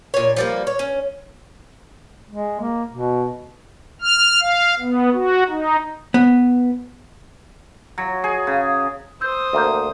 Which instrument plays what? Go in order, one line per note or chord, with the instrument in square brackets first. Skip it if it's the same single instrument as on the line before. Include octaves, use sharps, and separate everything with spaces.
[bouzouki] A#2 C#5
F3 G3 A#3
C#5
C#4
[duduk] G#3
A#3
B2
[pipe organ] F6
F5
B3
F#4
D#4
[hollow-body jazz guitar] B3
[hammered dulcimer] F#3
G#4
C#3
[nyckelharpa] C5 D#6 [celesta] E6 G6
[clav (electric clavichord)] D2 A#3 [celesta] E5 G6